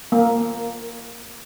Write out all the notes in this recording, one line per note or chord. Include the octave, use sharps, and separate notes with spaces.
A#3